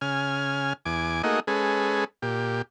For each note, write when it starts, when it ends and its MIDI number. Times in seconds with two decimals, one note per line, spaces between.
0.01 0.73 49
0.01 0.73 80
0.01 0.73 89
0.85 1.22 40
0.85 1.22 80
0.85 1.22 86
1.23 1.40 57
1.23 1.40 58
1.23 1.40 63
1.23 1.40 66
1.23 1.40 68
1.23 1.40 75
1.47 2.04 56
1.47 2.04 61
1.47 2.04 68
1.47 2.04 69
1.47 2.04 71
2.22 2.62 46
2.22 2.62 67